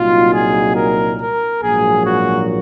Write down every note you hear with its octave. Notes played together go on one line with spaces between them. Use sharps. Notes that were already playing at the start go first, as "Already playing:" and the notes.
Already playing: C2 A#2 F#3 A#3 D#4 F4
G#4
A#4
A#4
A#1 G#2 F#3 A#3 G#4
F#4